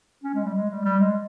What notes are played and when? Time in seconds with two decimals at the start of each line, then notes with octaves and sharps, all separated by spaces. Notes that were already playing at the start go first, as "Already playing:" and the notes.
0.24 C#4
0.34 G#3
0.44 G3
0.54 G#3
0.70 G3
0.85 G3
1.00 G#3